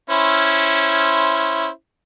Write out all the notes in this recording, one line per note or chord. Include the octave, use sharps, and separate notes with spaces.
C#4 E4 C5